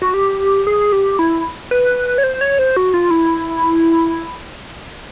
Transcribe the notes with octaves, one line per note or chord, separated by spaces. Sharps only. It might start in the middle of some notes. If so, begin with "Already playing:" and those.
F#4
G4
G#4
G4
E4
B4
C#5
C5
C#5
C5
F#4
F4
E4